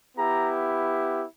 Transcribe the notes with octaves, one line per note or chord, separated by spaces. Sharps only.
B3 E4 G4 A#5